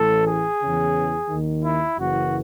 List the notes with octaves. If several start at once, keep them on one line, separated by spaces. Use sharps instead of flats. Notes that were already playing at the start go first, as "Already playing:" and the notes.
Already playing: A1 A2 E3 A4
G#4
E2 C#3 E3
D#2 D#3
E4
F#1 F#2 C#3 E3 F#4